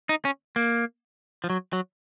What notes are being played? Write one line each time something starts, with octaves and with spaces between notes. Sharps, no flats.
D#4
C#4
A#3
F3
F#3
F#3